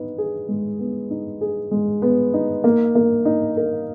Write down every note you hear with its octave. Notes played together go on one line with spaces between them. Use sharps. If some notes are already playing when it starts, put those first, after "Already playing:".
Already playing: B3 D#4
G#4
G#3
B3
D#4
G#4
G#3
B3
D#4
A#3
A#3
D#4
A#4